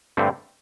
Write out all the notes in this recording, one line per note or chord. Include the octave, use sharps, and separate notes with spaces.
G2 D3 A3 C4